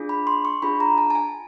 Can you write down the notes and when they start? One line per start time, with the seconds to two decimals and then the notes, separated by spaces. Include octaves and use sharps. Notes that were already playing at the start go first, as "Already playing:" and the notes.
Already playing: D4 F4 G#4
0.09 B5
0.27 C6
0.45 C#6
0.62 D4 F4 G#4 B5
0.80 A#5
0.98 A5
1.10 A5
1.15 G#5